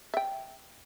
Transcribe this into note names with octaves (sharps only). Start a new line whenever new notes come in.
E5 G5